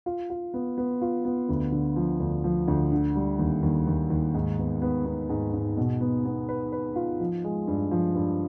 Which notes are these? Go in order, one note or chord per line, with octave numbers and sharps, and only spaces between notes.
F4
F4
B3
B3
F4
B3
D2
D3
F3
D2
F3
D2
D3
G3
D#2
D#2
D#2
D#2
G#2
B3
B3
B3
G#2
G#2
B2
B3
B3
B4
B4
F4
F3
G#3
G2
F3
G2